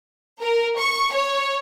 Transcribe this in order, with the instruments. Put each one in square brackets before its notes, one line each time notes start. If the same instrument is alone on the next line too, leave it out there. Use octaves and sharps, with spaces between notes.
[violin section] A#4
C#6
C#5